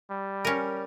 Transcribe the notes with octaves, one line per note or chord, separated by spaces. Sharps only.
G3
C#4 A#4